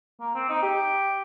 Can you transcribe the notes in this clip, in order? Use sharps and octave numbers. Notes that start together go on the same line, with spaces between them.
A#3
C4
D#4
G4